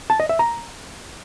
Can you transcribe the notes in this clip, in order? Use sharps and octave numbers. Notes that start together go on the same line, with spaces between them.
A5
D#5
E5
A#5